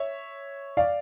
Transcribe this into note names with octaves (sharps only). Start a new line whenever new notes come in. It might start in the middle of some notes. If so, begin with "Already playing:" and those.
Already playing: C#5 E5
D5 F5